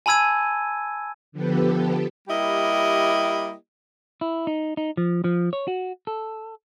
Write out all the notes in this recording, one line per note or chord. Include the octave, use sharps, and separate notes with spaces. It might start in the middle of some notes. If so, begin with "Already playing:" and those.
G#5 A5 B5 E6 G#6 D#7
D3 F3 B3 G4 A4 B4
G3 A#3 E4 G4 D#5
E4
D#4
D#4
F3
F3
C#5
F#4
A4